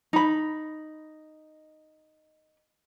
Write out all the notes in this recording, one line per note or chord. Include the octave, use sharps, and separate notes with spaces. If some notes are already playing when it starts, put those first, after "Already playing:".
D#4 B5